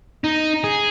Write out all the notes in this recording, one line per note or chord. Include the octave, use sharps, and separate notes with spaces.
D#4
G#4